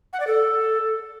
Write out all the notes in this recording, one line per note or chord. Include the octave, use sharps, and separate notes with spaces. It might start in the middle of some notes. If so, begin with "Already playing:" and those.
F#5
D5
A4